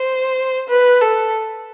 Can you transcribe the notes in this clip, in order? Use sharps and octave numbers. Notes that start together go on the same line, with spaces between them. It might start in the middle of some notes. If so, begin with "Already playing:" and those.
Already playing: C5
B4
A4